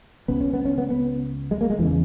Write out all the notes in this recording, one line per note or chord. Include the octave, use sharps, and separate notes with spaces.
C#2 C#3 B3
C#4
B3
C#4
B3
B3
G#3
A#3
G#3
E2 C#3 E3